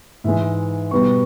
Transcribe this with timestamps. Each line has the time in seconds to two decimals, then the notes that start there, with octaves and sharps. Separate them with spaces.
0.24 G#2 E3 G#3 E5
0.91 B2 G3 B3 C#6